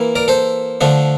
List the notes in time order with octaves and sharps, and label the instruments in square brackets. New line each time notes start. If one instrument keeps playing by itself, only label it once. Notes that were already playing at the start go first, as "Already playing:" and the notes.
Already playing: [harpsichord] E3 A#3 E4
A#4 D5
A4 C5
D3 F3 A3 D4